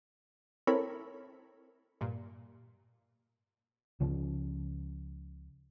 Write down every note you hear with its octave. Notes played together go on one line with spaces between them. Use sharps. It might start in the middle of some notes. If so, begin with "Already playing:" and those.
C4 E4 A4 A#4 C#5 B5
G2 A#2
C#2 C#3 F3